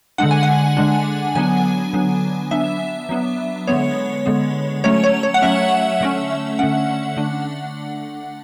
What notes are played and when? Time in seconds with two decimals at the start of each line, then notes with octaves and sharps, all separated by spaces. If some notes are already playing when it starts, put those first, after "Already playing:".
0.18 D3 G#3 D4 F#5
0.31 G#5
0.43 F#5
0.77 D3 G#3 D4
1.35 D3 F#3 B3 D4 G#5
1.93 D3 F#3 B3 D4
2.51 F#3 B3 D4 E5
3.09 F#3 B3 D4
3.67 D3 G#3 B3 C#5
4.26 D3 G#3 B3
4.84 F#3 A3 C#4 C#5
5.04 C#5
5.23 C#5
5.34 F#5
5.42 F#3 A3 C#4 E5
6.01 D3 A3 C#4
6.59 D3 A3 C#4 F#5
7.17 D3 A3 D4